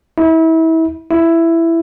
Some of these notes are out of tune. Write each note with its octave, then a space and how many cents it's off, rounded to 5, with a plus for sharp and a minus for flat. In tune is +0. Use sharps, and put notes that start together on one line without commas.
E4 -30
E4 +10